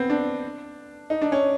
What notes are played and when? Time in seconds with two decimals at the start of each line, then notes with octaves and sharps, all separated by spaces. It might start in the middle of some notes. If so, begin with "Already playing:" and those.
Already playing: B3 C4
0.10 D4
1.10 D#4
1.22 D4
1.32 C#4